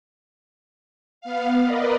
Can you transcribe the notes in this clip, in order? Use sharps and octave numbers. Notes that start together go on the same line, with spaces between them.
B3 F5
A#4 B4 D5 D#5